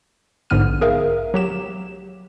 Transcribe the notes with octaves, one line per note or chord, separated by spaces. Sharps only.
A#1 G#2 D3 B3 F6 D#7
G#4 A#4 E5 F5
F#3 G4 E7